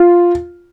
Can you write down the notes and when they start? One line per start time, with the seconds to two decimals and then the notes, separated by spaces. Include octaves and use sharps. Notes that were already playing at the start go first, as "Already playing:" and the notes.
Already playing: F4